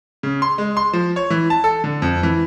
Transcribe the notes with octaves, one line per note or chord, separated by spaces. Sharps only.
C#3
C6
G#3
C6
F3
C#5
E3
A5
A4
D3
F2
E3